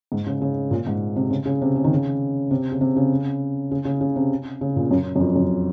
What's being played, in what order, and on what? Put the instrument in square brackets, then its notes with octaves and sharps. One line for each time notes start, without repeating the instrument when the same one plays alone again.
[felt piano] G#2
C#3
C#3
A#2
G#2
C3
C#3
C#3
C3
C#3
D#3
C#3
C3
C#3
C3
C#3
C#3
C#3
C#3
C3
C#3
A#2
F#2
F#2
F2
F#2